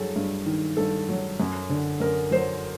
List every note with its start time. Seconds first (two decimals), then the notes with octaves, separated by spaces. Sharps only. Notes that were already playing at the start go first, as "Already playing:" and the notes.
Already playing: G2 F#3 G#4 A4
0.16 G2
0.46 D#3
0.77 G2 A4
1.09 F#3
1.40 F#2
1.69 D3
2.00 F#2 A#4
2.31 F#3 C5